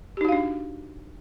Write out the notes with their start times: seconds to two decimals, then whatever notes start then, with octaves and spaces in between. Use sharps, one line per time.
0.17 G4
0.21 D#4
0.25 F#4
0.29 F5
0.32 D4